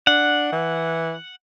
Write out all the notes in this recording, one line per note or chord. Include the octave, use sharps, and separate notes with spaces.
D4 F#5
E3